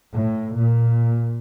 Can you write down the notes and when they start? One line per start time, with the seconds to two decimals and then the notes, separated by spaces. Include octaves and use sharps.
0.13 A2
0.56 A#2